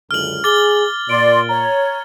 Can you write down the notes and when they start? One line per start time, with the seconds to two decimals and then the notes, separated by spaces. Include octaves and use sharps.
0.11 C#2 F#2 D3 F6 F#7
0.44 G#4 D6 A6 G7
1.09 A#2 D5 C6 D7
1.49 C#5 A#5